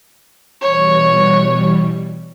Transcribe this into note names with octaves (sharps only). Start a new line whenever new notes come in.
B2 E3 G3 C#5